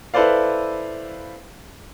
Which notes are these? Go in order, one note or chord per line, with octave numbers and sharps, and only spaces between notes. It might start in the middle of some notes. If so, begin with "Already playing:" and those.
E4 A4 B4 C5 D5 F5